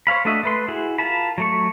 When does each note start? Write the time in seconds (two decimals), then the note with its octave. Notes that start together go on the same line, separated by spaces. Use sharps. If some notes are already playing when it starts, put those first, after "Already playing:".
0.07 C5 C#5 F5 B5
0.25 A3 D4 F#4 D#5 E5
0.43 A3 B4 C6
0.68 E4 F#4 G#4
0.98 F4 A#4 A5 B5
1.38 F#3 A3 C#6